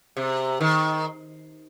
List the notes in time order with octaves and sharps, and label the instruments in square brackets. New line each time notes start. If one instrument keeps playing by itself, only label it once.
[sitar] C3
D#3